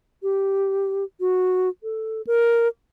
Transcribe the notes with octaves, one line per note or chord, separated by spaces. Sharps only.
G4
F#4
A4
A#4